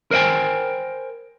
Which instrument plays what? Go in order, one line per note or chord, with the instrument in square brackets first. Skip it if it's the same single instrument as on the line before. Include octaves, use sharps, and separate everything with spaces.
[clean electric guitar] A#4 C5 D#5 G5 G#5